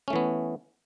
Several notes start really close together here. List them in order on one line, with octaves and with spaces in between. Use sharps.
C#4 A3 E3 B3